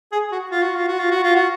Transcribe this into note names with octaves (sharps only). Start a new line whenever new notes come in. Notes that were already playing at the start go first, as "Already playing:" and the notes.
G#4
F#4
F4
F#4
F4
F#4
F4
F#4
F4
F#4